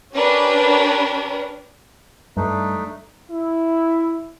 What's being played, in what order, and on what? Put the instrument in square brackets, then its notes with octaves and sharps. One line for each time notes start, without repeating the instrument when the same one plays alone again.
[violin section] C#4 D4 G4 A#4 B4
[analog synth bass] G2 [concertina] A3 D4 D#4
[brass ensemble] E4